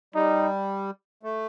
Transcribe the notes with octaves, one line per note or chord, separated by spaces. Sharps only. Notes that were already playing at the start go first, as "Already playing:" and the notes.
G3 D#4
A3